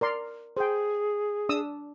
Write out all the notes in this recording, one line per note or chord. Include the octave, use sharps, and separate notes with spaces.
A#4 D5 C6
G#4 C5 G5
D4 D#6 E6